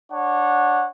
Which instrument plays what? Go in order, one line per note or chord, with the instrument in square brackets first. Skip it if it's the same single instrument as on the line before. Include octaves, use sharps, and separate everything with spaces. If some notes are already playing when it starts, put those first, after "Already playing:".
[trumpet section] D4 C#5 F#5